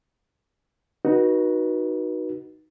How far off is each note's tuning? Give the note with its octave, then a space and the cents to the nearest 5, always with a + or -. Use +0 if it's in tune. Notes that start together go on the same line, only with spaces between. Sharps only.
D#4 +0 F#4 +0 B4 -35